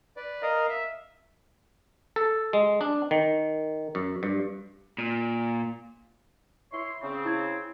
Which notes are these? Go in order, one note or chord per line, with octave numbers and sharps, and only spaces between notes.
B4 D5
A#4 D#5 F5
E5
A4
G#3
D4
D#3
F#2
G2
A#2
E4 C#5 C6
C#3 C4
E4 G#6